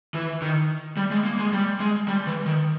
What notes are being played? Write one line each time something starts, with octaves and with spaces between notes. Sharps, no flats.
E3
D#3
G3
G#3
A#3
G#3
G3
G#3
G3
E3
D#3